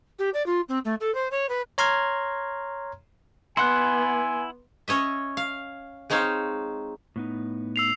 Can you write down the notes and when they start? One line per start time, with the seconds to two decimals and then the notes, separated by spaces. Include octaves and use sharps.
0.19 G4
0.34 D5
0.46 F4
0.69 C4
0.85 A3
1.00 A4
1.15 C5
1.31 C#5
1.49 B4
1.78 C#5 A#5 C6 F6 G#6
3.57 B3 E4 F#5 G#5 C6 F#6
4.88 C#4 C#5 D#5 E5
5.37 F5
6.10 G#3 C4 D#4 C#5 F5
7.16 A2 B3 D#4
7.76 E6 C7 F7